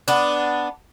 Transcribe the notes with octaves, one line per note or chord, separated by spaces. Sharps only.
B3 D4